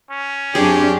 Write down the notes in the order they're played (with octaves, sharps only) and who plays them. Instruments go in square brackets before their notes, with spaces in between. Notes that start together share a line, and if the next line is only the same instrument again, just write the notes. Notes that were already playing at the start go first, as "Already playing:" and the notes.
[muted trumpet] C#4
[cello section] F#2 C4 D4 [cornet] G4 [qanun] G#4